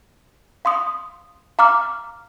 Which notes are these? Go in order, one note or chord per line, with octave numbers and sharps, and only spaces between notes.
F5 C6 D#6
F5 A#5 D6 F6